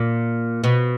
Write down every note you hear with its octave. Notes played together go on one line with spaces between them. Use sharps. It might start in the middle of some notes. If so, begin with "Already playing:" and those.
Already playing: A#2
B2